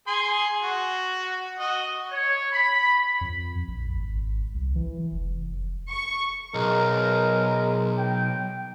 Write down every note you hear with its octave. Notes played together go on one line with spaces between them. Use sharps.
G#4 G#5 C6
F#4
F#4 D#5
C#5
B5
F2
A#1
G#1
C2
E3
F1
C#6
B1 G#3 A#4
G5